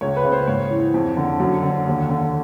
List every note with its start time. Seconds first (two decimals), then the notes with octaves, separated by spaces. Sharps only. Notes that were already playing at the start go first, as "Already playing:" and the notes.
0.01 C#2 C#5
0.17 B4
0.24 C#3
0.32 C5
0.47 G#2 C#5
0.71 E3
0.94 F2
1.17 D3
1.40 F#2
1.63 D3
1.86 D#2
2.09 D3